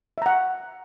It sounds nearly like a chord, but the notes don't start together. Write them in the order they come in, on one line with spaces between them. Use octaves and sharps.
E5 A#5 F#5